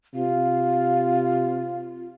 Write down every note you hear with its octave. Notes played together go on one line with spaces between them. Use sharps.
C3 F4 F5